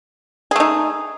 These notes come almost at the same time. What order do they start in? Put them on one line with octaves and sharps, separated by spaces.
G#4 A3 D#4